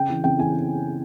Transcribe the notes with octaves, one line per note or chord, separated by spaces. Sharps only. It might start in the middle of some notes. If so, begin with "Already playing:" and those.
Already playing: C#3 G5
E3
C#3 G5
E3 G#5